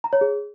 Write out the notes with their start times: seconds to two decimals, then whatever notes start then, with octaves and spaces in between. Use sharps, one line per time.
0.04 A#5
0.13 C#5
0.21 G#4